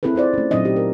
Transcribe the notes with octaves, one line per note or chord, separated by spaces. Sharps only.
C4 E4 G#4 A4 B4
C4 F4 C5 D5
A3 C#4
A#2 F#3 C4 D4 D#4 D#5
G4
A#4